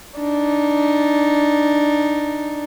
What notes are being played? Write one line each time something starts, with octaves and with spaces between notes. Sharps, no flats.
D4 D#4